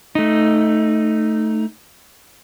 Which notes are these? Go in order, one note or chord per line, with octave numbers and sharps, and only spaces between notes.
A3 D#4